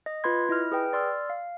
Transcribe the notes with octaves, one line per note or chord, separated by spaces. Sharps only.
D#5
F4 B4 B5 C6 G#6
E4 D#5 F6
G#4 B4 G5 F6
D5 C6 E6 F6
F5